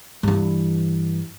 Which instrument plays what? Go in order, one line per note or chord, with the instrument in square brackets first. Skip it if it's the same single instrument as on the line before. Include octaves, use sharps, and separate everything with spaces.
[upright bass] G2 E3